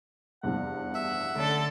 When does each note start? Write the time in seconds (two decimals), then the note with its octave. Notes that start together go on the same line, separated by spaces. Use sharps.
0.43 F1 E2 G2 F#5
0.95 E5
1.35 D3 A3 C#4 A4